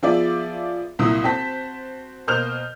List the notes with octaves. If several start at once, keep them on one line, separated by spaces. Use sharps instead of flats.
F3 B3 F4 G#4 D5 E5
C2 A#2 F#3 E4 D#6
C4 F#4 C5 A5 B6
B2 A#3 C5 F6 G6 F7